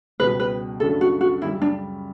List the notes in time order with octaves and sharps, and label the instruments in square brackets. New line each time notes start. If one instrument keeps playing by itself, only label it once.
[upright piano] C#2 B2 G3 [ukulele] B4
[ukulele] B4
[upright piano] F#2 C#3 F#3 A3 D4 [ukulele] A4
[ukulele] F#4
F#4
[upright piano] F#2 C#3 G3 [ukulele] E4
[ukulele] D4